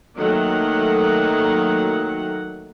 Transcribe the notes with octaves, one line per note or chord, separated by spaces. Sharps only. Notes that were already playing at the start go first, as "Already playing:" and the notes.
D#3 F#3 A3 A#3 D#4 F#5